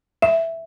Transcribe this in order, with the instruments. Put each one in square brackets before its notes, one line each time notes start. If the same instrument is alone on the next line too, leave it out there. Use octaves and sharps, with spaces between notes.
[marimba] E5